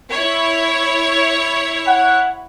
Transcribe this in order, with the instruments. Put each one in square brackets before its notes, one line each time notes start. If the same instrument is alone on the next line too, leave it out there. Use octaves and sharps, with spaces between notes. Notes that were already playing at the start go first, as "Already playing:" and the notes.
[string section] E4 C#5
[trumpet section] F#5